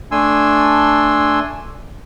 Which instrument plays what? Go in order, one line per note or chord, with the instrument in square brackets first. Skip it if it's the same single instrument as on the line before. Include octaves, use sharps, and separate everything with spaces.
[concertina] A3 D4 G#5 C6 E6